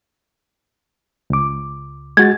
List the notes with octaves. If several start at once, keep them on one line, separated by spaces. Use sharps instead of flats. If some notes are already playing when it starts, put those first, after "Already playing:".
C#2 D6
G#3 F#4 G#6 A6